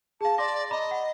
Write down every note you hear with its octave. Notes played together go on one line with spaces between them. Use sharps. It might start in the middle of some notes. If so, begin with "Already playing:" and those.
G#4 F5 A5
D5 C6 D6 A#6
D#5 A#5 B5 D6
F#5